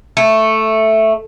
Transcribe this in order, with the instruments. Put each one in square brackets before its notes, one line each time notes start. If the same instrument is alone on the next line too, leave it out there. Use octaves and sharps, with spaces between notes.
[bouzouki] A3